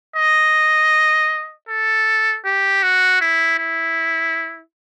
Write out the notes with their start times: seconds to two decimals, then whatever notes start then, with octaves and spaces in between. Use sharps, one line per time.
0.16 D#5
1.69 A4
2.45 G4
2.83 F#4
3.21 E4
3.59 E4